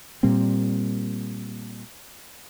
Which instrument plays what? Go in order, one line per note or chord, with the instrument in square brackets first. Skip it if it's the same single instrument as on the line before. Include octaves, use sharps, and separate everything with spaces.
[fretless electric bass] A#2 G3 A#3 C4